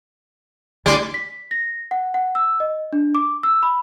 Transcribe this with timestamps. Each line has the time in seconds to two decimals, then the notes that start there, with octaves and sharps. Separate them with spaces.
0.86 D2 D3 G3 E4 D5 G#5 C6 D6
1.14 B6
1.51 A#6
1.91 F#5
2.14 F#5
2.35 E6
2.60 D#5
2.93 D4
3.15 D6
3.43 E6
3.63 B5